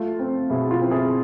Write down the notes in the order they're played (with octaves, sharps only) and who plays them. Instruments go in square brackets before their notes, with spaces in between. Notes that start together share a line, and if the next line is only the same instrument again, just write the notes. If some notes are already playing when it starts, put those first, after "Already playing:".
Already playing: [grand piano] A3 F4
C4
B2 E4 G#4
F4
C4
E4 G#4